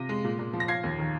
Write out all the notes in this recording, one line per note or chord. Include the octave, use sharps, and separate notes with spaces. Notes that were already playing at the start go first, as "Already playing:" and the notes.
Already playing: C3 F4 A#6 D#7
G#3
A#2
A#2
F3
A#6
F4 G#6 C7
D#2
D#3